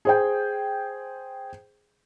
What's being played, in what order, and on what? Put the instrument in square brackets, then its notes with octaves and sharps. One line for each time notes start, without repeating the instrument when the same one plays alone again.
[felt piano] G#4 C5 G5